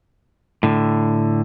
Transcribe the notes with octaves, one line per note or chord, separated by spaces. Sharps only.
A2 D3